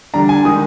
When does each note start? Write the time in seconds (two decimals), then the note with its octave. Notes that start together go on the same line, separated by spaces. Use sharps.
0.14 D3 G3 D4 A#5
0.29 G#5
0.45 D#3 G#3 D#4 D#6